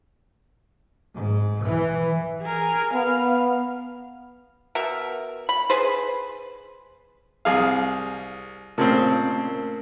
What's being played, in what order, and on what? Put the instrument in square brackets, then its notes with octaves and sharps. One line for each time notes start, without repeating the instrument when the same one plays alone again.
[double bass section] G#2
E3
[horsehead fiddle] G#4 A#4
[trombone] B3 [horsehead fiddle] F5
[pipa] B2 A#4 E5
B5
G#4 B4 C5
[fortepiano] C2 G#4 F5
[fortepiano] A#2 C#3 C4 [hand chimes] A3 A#4 A5